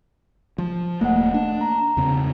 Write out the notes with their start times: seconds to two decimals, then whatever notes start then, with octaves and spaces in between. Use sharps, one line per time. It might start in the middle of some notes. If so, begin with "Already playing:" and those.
0.58 F3
1.01 D#1 D#2 A3 A#3 F#5
1.34 D4
1.61 A#5
1.97 E2 C#3 C4